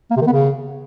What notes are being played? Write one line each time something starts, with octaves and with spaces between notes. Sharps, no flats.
A#3
C3
D#3
B3
C#3